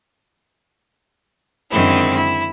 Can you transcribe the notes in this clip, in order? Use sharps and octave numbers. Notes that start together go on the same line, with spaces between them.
F#2 D3 D#3 G#3 C4 E4
E4